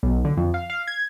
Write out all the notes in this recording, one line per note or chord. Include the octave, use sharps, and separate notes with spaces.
B1
D3
F2
F5
F5
G#6